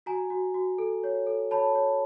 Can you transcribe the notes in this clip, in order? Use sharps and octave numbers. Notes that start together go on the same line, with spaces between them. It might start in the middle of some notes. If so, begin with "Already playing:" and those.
F#4 G#5 A#5
F#4
F#4
A4
C#5
A4
C#5 A5 B5
C#5